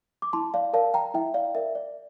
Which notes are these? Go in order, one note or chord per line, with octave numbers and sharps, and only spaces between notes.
D6
E4 A5 C6
D5 F5
A#4 D5 F5 A5
G5 A#5
E4 E5 G5
D5 F5
A#4 D5 E5
D5